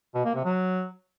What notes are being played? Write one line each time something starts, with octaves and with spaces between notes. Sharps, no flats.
B2
A#3
C3
F#3